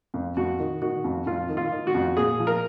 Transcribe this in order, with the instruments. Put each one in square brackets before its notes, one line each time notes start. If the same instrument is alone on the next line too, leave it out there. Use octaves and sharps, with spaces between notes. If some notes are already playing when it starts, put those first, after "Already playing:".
[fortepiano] F2
F2 F#4
D#3
D#3 F#4
F2
F2 F4
D#3
F4
D#3
F#4
F2
A#2 G#4
F3
A#4